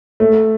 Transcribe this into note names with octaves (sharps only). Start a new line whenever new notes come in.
A3